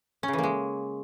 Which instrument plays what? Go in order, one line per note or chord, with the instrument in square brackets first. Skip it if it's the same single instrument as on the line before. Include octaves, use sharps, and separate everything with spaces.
[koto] C#4
C#3
E3
A#3
G#3